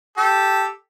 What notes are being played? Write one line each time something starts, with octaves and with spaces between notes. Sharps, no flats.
G4 A4